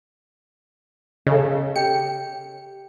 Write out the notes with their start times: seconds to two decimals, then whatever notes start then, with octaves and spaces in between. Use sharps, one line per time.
1.27 C#3 A4 D#5
1.76 G4 C#7